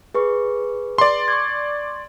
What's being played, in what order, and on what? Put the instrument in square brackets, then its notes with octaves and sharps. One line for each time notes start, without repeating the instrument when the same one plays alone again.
[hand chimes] G#4 B4 C#6
[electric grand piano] D5 C6
[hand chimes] C#6 D6 G#6